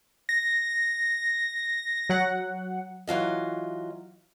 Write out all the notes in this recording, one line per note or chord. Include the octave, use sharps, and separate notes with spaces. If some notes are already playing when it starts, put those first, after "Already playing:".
A#6
F#3 F#5
E3 F#3 F4 D#5